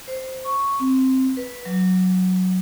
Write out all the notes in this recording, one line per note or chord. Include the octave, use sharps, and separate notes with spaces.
C5
C#6
C4
B4
F#3